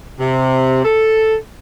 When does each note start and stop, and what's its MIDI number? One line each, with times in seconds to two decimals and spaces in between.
0.20 0.83 48
0.85 1.36 69